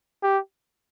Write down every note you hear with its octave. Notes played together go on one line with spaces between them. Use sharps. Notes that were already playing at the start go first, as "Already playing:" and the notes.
G4